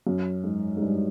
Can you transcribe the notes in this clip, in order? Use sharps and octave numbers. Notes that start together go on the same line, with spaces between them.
F#2
G#2
G#2
G2